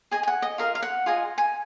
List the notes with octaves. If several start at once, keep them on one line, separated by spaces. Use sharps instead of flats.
G#4 D#5 G#5
G#5
F#5
D#5
F4 A#4 D#5 F5
F5
F#5
F4 G#4 D#5 G#5
G#5